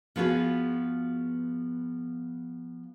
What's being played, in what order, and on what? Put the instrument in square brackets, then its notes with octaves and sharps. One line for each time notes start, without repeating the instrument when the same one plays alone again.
[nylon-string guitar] F3 B3 F4 F#4 G#4 B4